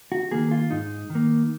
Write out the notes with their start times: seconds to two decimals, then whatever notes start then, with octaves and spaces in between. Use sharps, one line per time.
0.12 F#4
0.31 D#3 A#3 G#4
0.51 F4
0.70 G#2 D#4
1.10 D#3
1.15 A#3